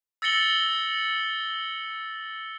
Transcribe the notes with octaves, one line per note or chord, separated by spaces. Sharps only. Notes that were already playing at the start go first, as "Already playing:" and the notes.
E6 A6 A#6 C#7 F#7 G7